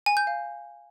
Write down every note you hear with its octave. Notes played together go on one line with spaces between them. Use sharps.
G#5
G6
F5